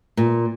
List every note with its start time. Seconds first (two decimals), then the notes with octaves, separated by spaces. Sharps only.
0.17 A#2